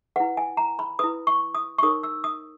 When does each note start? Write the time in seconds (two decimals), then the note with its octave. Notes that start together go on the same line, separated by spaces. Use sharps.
0.16 E4 B4 F#5
0.37 G#5
0.57 A#5
0.79 B5
0.99 E4 B4 D#6
1.27 C#6
1.55 D#6
1.78 C#6
1.83 D#4 A#4 C#5 D#6
2.03 E6
2.24 D#6